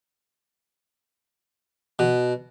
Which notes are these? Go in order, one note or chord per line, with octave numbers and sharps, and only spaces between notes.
B2